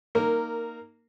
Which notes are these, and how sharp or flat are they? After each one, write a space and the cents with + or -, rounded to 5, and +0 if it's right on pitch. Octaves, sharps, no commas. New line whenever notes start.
A#3 +0 D#4 +0 A#4 -15